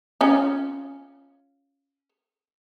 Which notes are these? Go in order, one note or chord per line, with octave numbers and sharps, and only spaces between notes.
C#4 F4